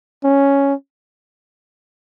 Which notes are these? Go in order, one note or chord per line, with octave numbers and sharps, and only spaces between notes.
C#4